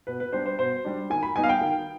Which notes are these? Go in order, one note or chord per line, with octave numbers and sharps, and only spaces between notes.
B2 B4
B4
G3 D4 C5
C5
B2 C5
G3 D4
D#3 G#5
B5
G3 B3 D#4 G#5
F5
G5
D#3